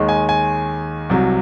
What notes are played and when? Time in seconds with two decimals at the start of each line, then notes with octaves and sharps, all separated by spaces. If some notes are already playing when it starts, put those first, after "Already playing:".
Already playing: D#2 D#3 G#3
0.09 G#5
0.29 G#5
1.10 C2 C3 F#3